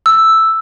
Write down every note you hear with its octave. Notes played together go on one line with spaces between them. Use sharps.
E6